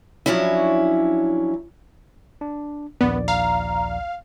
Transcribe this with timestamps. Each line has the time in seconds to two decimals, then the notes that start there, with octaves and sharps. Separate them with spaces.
0.26 F3 F#3 C#4 D4 E4
2.41 D4
3.01 A#1 D#2 B3 D5
3.28 F5 A#5